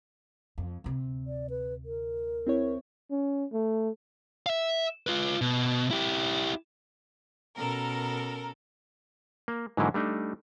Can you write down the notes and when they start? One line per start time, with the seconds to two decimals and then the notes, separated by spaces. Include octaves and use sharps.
0.58 F2
0.84 D2 C3
1.27 D5
1.50 B4
1.85 A#4
2.47 C4 E4 C#5
3.11 C#4
3.53 A3
4.46 E5 F5
5.07 F4 B4
5.41 B2
5.91 E4 G4
7.57 B2 C#4 A4 A#4
9.48 A#3
9.77 G#2 D3 E3 F#3 A#3 E4
9.94 G3 A3 D4 D#4